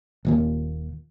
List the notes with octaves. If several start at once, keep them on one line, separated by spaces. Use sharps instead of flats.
D#1 D#2 A#2